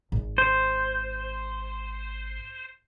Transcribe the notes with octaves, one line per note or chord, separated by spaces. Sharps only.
G#1
C5